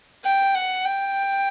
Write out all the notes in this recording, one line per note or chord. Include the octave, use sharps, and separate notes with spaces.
G5
F#5
G5